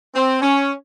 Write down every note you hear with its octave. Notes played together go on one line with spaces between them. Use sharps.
C4
C#4